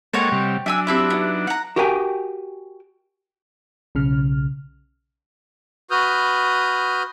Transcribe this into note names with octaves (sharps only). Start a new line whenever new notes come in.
G#3 A#3 A4 C5 C#5 D#5 F#5 G5
C3 G3 G5
F#3 D4 E5 G#5 E6
C4 E4 G4 E5 A5 B5
B3 D#4 E4 E5
F#5 A#5
F#4 G4 A#4 D5 G5 G#5
B1 C#3 F6
F#4 B4 D#6 F6 G6